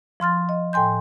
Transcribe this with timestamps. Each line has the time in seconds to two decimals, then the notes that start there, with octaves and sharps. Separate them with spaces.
0.20 F3 C6 F6 A6
0.49 D#5
0.73 A2 G5 G#5 C6 G6